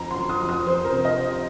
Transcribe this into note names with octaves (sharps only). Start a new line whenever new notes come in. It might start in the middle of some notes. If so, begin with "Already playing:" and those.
Already playing: F2 A#5
C6
F2
D#6
F2
D#6
F2 C5
A#4
C3 C5
D#5
C4